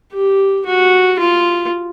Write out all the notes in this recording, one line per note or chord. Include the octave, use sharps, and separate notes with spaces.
G4
F#4
F4